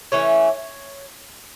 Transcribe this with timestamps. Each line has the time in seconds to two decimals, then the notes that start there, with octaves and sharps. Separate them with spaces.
0.12 E3 A3 C#4 C#5